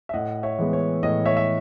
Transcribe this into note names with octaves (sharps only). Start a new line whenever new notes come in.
E5
A2 D#5 F#5
C#5 E5
E3 G#3 B3
C#5
A2 D#5
C#5 E5
E5